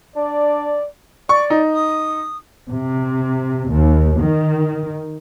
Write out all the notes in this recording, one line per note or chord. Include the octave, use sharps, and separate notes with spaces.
D4 D5
D5 C#6
D#4
D#6
C3
D#2
D#3